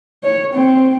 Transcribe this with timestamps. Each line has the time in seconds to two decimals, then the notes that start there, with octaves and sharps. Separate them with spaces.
0.23 C#5
0.54 C4